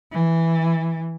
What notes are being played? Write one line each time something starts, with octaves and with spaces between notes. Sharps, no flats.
E3